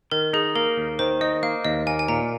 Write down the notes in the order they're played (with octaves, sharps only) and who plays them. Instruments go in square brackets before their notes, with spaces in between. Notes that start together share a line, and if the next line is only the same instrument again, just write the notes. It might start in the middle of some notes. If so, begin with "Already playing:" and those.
[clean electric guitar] D#3 [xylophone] A#4
[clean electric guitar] D#4 [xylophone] G#4
[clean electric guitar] A#3 [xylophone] A#4
[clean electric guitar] D#2
[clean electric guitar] D#3 [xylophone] C5
[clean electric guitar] D#4 [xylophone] D#5
[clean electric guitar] A#3 [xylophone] F5
[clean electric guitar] D#2 [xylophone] D#5
[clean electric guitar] A#3 [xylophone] G#5
[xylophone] G#5
[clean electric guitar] A#2 [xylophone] A#5